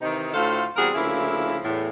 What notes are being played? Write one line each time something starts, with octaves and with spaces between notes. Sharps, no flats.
C3 D#3 E3 D#4
D2 A2 F4 A4 C5 F5
E2 G3 C4 F#4 G#4 A#4
D2 C#3 F3 A#3 E4
E2 A2